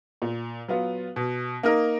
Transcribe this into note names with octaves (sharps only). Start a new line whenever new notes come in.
A#2
F#3 B3 F4
B2
A#3 D#4 A#4